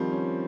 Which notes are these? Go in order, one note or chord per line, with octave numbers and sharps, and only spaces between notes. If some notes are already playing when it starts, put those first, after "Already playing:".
Already playing: D#3 F3 G3 C4
C#4